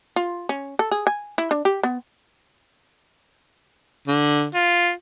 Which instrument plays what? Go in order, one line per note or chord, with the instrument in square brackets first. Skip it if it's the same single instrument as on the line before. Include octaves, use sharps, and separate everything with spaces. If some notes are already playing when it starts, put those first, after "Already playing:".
[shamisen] F4
C#4
A4
G#4
G#5
E4
D4
G4
B3
[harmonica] D3
F4